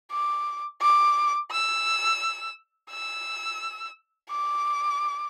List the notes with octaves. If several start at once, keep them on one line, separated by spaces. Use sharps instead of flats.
D6
D6
E6
E6
D6